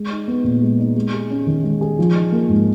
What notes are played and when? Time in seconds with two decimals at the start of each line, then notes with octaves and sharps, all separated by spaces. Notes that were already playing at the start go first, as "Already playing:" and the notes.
Already playing: G#3
0.10 D#4
0.28 B3
0.44 A#2
0.62 G#3
0.79 D#4
0.95 G#3
1.13 G#4
1.30 C#4
1.46 D#3
1.64 G#3
1.81 G#4
1.99 F3
2.15 D#4
2.32 A#3
2.49 G#2